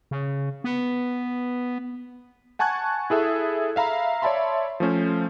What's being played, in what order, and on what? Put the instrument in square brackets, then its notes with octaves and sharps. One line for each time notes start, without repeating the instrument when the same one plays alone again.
[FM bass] C#3
B3
[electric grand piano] F#5 G#5 A5 C#6 F#6 G#6
E4 G#4 A4 E5
E5 F5 A#5 B5
C#5 D5 E5 A5 B5 C6
F3 A3 C#4 C5